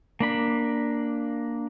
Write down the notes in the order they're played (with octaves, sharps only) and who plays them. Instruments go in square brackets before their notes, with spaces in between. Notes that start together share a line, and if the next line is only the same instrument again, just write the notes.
[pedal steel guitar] A#3 D4 B5